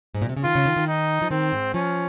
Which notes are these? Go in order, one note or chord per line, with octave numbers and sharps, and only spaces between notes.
G#2
A#2
C3
C#3
D#3 F4
C#3
D#3
D#3
D#4
F3
D#3 C4
G#2
F3 C#4